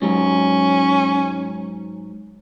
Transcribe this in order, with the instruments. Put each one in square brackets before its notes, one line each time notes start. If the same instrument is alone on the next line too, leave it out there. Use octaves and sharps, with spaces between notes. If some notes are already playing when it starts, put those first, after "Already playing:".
[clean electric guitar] G#2 F#3 [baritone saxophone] C#4